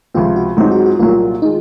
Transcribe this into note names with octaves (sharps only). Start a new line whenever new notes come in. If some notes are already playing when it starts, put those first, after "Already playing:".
C#2 C3 F3 C4 F4
F#4
G#2 F#3 C4 D#4 G#4
F#4
F#4
C2 A#2 F#3 A#3 F4
D#3 G#3 D#4